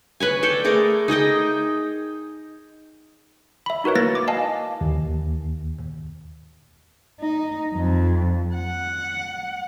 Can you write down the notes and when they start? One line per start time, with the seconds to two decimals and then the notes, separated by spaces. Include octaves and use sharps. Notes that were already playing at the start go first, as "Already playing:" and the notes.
0.20 B4 C#5 G#5
0.43 A4 D5 G5
0.64 A3 G#4 A#4 D6
1.08 D#4 G#4 D#5 G5
3.66 E5 B5
3.84 D#4 F#4 A#4 B4 C#5
3.95 A#3 E4 A#4 B4 A6 A#6
4.15 D6
4.28 D#5 F5 G#5 A5
4.81 D#2
7.20 D#4
7.75 F2
8.55 F#5